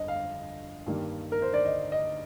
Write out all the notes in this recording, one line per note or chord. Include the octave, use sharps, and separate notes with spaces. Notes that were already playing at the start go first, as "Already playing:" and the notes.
Already playing: G1 F2 D3 D#5
F5
G2 D#3 G3 A#3
A#4
C5
D5
D#5
D#5